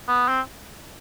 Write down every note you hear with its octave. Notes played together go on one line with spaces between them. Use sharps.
B3
C4